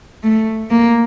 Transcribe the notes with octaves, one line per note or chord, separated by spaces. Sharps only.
A3
A#3